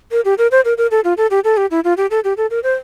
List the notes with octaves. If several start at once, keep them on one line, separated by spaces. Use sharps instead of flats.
A#4
G4
A#4
C5
A#4
A#4
A4
F4
A4
G4
A4
G4
E4
F4
G4
A4
G4
A4
A#4
C5